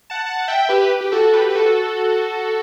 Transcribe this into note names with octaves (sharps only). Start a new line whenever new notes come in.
F#5 A5
F#5 A5
E5 G5
G4 B4
G4
F#4 A4
G4 B4
B4
F#4 A4